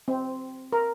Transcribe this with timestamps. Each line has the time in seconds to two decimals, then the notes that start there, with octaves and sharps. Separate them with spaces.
0.08 C4
0.72 A#4